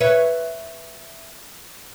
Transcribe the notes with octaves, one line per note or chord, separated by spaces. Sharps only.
B4 C#5 E5